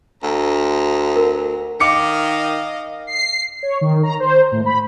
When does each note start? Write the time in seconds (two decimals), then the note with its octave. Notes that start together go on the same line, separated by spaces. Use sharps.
0.23 D2 A#5
1.16 A#4
1.80 D#3 D#5 F5 D6 C#7
3.07 C7
3.63 C#5
3.81 D#3
4.03 A#5
4.20 C5
4.52 A2
4.66 B5